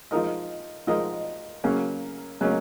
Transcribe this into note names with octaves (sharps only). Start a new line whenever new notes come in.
F3 G#3 D#4 A#4 D#5
F3 G#3 D#4 A#4 D#5
C#3 F#3 A#3 C#4
C#3 F#3 A#3 C#4